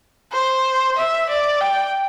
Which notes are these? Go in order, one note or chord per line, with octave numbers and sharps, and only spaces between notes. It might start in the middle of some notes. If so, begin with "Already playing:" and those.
C5
E5
D5
G5